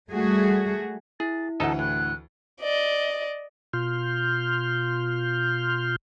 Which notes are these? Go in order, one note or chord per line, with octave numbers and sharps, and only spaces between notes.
G3 A3 F#4 G#4
E4 G#4 A6
D2 E3 D#4 A4 D#5 F#5 A5
A2 F#6
D5 D#5
B2 F4 C6 F6 G6